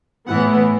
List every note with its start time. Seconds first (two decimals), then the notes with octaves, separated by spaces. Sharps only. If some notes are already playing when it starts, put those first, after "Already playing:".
0.27 A2 E3 B3 F#5